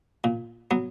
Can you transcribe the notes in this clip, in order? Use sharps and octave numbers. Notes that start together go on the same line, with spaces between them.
A#2
F#3 B3